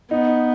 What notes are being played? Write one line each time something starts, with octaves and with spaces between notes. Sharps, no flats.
B3 D#4